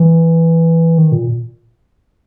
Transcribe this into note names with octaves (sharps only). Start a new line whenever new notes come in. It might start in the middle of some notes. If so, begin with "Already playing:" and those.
Already playing: E3
D#3
A#2